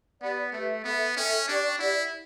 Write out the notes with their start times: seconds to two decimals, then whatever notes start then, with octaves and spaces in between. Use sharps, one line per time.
0.21 B3 G4 D5 F#5 B5
0.52 A3 G4 B4 E5
0.84 B3 A4 E5 B5
1.16 C#4 A4 E5 G5
1.48 D4 G4 D5 G5 C#6
1.79 E4 G4 D5 F#5